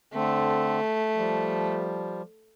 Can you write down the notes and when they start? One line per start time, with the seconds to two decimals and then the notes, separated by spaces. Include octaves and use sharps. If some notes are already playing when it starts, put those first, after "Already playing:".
0.13 D3 A3 C4
1.16 F3 G3